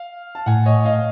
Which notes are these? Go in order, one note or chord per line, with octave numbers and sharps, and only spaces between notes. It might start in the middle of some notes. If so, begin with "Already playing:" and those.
Already playing: F5
A5
A2 F#5 G#5
C#5 D#5
D#5 F5